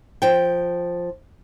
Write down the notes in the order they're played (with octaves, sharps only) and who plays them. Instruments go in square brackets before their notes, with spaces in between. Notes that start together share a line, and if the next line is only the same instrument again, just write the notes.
[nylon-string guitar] F3 G5